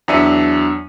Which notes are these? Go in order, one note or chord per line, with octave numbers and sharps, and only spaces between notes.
E2 F#3 D4 E5 C#7 D#7